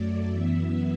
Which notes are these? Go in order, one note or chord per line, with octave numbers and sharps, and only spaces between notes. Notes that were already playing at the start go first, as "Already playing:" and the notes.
Already playing: F#2 F#3 A3 D5
F#2 E3 B3 E5